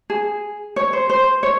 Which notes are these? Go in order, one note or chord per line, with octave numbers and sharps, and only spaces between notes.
G#4
C#5
C5
C5
C#5